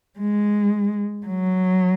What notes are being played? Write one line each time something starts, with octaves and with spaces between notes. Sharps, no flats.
G#3
F#3